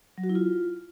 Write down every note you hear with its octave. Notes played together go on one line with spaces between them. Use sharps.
F#3
F#4
E4
F4